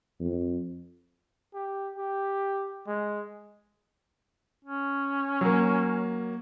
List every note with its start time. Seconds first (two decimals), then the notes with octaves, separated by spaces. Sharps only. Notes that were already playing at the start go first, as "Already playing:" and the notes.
0.21 F2
1.54 G4
1.97 G4
2.87 G#3
4.64 C#4
5.41 F#3 A#3